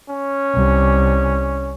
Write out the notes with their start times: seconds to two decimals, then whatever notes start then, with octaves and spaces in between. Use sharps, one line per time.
0.10 C#4
0.55 C2